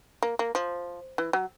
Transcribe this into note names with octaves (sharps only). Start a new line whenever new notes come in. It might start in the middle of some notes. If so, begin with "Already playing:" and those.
A#3
A#3
F3
E3
F#3